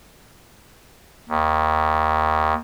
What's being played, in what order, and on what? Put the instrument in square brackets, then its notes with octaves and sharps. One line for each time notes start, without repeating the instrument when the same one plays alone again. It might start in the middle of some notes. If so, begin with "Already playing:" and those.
[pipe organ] D#2